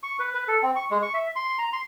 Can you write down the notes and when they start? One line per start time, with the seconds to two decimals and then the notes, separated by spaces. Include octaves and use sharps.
0.03 C#6
0.20 B4
0.34 B4
0.48 A4
0.63 C4
0.76 C#6
0.91 G#3
1.02 C#6
1.14 E5
1.36 C6
1.58 A#5
1.73 C6